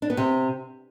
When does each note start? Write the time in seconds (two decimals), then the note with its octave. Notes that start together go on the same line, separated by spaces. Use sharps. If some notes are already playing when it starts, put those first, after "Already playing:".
0.02 D4
0.10 B3
0.17 C3